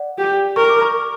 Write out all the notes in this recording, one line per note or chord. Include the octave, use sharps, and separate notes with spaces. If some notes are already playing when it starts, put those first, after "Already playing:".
Already playing: D5 F#5
G4
A#4 C#6
D6
A#5 C#6